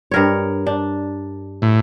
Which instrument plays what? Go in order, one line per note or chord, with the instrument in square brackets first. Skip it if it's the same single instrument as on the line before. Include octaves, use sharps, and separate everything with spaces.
[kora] G2 A#4 C#5
D4
[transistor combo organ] A2